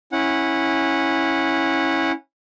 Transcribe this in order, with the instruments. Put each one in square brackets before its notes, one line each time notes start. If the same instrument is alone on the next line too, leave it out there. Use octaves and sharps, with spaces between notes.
[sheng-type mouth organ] C#4 E4 F#5